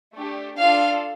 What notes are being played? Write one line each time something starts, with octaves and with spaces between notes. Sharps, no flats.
A3 D4 G4
D4 F4 A4 F5